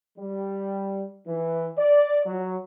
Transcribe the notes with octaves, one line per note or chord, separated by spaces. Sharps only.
G3
E3
D5
F#3